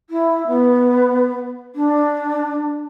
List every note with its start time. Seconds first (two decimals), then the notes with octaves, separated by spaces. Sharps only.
0.10 E4
0.47 B3
1.75 D4